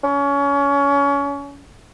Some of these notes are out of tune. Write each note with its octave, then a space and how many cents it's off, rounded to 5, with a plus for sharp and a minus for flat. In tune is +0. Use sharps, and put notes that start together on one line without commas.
C#4 +25